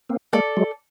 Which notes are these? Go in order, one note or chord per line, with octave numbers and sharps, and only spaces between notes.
A#3 C4
G#3 A#3 A4 D5
F#3 G#3